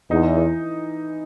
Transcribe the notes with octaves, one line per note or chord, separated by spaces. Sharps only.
E2 D#4
E3